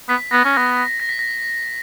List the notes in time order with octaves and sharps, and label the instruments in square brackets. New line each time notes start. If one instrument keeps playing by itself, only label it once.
[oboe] B3 [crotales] B6
[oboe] B3 [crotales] A#6
[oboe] C#4
[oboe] B3 [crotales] A#6
[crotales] A#6
B6
A#6